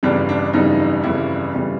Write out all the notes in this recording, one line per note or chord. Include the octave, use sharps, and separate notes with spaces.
G1 F2 C#3 E3 G3 D4
D4
G1 F2 C#3 E3 G3 D#4
G1 F2 C#3 E3 G3 E4
G1 F2 C#3 E3 G3